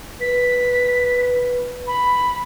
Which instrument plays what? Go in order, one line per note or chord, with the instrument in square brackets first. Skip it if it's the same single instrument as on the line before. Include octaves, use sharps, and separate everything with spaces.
[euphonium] B4 [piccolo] B6
[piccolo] B5